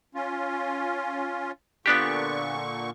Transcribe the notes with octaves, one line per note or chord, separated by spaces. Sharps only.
C#4 F4
A#2 D3 B3 D4 G4 C#6